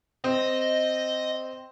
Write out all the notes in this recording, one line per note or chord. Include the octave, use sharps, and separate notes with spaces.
C4 D#5